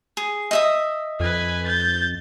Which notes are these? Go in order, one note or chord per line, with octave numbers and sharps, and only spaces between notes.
G#4
D#5 E5 D#6
F2 B4 G#5
G6 A6